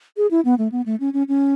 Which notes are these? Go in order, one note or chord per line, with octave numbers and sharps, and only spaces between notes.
G#4
E4
B3
A3
B3
A3
C#4
C#4
C#4